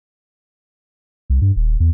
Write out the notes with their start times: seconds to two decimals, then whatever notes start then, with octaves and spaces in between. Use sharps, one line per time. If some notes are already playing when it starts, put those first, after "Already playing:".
1.30 C2
1.42 G2
1.56 D#1
1.80 E2